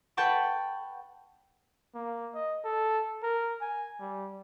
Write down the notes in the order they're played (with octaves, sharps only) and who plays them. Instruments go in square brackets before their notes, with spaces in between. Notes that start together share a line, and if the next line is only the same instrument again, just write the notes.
[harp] B4 F#5 G5 A5 C#6
[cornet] A#3
D#5
A4
A#4
G#5
G3